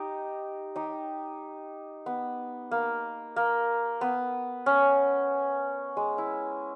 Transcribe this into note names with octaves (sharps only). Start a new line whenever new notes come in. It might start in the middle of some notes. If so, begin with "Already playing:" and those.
Already playing: D#4 G4
D#4 G4
B3
A#3
A#3
B3
C#4
G#3
E4